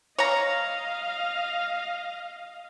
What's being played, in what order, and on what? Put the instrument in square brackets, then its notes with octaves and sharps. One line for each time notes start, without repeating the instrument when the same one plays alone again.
[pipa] C#5 A#5 [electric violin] D#5 F5